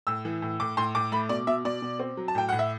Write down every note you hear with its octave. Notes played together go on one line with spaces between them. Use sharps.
A2 E6
E3
A2
A2 D6
A2 C6
A2 D6
A3 B5
B2 D5
B2 E5
B2 D5
B2
C4
F#3
A5
A2 G5
A2 F#5
E5